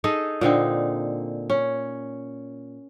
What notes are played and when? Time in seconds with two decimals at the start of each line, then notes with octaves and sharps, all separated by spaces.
0.04 D#4 G#4 A4 D#5
0.41 A#2 D3 C4 D#4
1.50 C#4